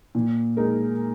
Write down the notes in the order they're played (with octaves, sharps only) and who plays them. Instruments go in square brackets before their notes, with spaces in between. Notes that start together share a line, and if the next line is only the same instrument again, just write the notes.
[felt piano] A#2
G#3 D#4 A#4